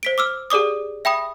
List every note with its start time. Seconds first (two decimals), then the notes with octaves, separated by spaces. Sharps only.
0.03 C5 B6 D7
0.18 D6 E6 F6
0.50 G4 G#4 D5 D6 D#6
1.05 E5 G5 B5 D#6